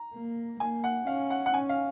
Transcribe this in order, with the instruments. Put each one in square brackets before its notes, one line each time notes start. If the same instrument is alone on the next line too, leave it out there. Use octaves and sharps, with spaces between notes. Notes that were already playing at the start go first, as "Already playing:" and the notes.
Already playing: [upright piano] A#5
[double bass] A#3
[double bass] A#3 [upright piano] G#5
[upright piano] F#5
[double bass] C#4 [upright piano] F5
[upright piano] F#5
F#5
[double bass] C#4 [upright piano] G#5
[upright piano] F5